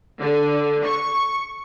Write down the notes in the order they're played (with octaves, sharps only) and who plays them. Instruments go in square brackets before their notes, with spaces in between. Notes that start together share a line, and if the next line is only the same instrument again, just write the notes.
[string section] D3
C#6